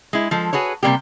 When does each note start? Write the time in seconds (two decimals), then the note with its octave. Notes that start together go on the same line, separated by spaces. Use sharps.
0.13 G#3 E4
0.31 F3 G#3 A4
0.53 F#4 G#4 B4 C#5
0.83 C3 G3 A#3 G4